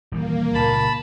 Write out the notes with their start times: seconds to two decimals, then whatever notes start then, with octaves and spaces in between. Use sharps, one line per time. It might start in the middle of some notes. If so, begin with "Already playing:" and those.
0.12 D#1 E3 G3 A#3
0.55 C#2 A#2 A5 B5